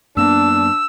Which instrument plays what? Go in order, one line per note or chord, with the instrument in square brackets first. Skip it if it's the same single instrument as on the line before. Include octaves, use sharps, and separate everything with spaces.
[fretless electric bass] F#2 A#3 B3 [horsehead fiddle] D4 [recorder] E6